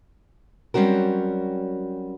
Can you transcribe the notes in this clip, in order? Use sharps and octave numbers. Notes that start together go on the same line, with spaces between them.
F#3 G3 C4 C#4 F#4 A#4